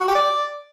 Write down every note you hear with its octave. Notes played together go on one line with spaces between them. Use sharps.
F#4
G4
D5